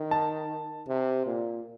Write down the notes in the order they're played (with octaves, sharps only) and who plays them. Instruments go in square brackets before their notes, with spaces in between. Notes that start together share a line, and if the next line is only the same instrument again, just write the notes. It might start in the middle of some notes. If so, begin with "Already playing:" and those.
Already playing: [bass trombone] D#3
[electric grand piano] A5
[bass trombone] C3
A#2